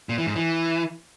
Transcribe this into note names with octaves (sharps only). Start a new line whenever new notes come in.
A#2
E3
G#2
E3